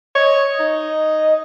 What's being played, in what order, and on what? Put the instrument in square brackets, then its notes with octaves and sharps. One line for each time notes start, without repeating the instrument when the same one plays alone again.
[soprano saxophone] C#5 [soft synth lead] D#5
[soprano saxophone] D#4